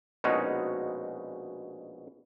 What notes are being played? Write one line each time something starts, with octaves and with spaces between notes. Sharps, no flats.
A#1 B2 G#3 C#4 D#4 F#4